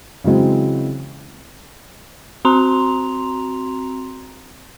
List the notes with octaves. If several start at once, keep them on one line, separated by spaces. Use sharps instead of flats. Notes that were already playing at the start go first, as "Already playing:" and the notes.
C#3 E3 F#3 G#3 C4
C4 F#4 A#5 C6 F7